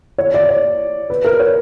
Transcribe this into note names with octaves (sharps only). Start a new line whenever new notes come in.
C#5
D5
C#5
B4
A#4
C#5